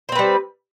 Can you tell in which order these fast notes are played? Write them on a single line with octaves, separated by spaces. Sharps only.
C5 C4 B4 G3